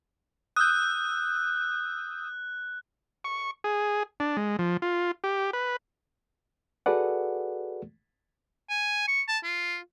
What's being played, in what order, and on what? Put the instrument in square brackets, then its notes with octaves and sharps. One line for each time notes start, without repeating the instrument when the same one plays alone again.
[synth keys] D#6 E6 G6 [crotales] F#6
[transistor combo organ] C#6
G#4
D4
G#3
F3
F4
G4
B4
[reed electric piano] F#4 G#4 A4 B4 D5 F#5
[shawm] G#5
C#6
A5
F4